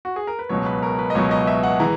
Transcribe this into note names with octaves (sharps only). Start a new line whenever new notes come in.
F#4
G#4
A#4
B4
C#2 B2 F#3 C#5
B4
A#4
B4
D#5
C#2 B2 F#3 C#5
D#5
E5
F#5
E3 G#3 A#5